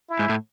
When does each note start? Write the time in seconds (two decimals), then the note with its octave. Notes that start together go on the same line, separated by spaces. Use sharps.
0.10 E4
0.19 G#2
0.29 A2